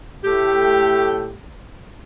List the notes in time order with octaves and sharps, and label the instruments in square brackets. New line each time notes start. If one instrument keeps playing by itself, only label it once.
[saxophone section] A2 A3 G4